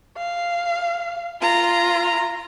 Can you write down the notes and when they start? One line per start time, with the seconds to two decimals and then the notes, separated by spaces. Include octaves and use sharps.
0.17 F5
1.42 F4 A#5